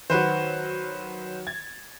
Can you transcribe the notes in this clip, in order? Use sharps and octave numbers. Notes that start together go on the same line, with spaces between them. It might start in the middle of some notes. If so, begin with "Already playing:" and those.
D#3 F#3 F#4 B4 C5
G#6 A6